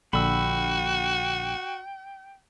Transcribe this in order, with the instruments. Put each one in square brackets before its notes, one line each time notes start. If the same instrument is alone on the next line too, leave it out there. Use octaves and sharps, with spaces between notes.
[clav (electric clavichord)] A#1 D3 [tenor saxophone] F#4 [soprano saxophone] G5 [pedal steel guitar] B5 E6